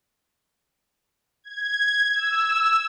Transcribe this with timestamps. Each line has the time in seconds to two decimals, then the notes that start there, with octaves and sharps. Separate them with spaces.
1.44 G#6
2.15 E6